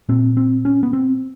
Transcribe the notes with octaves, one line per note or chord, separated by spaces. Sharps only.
A#2 C4
C4
C#4
B3
C4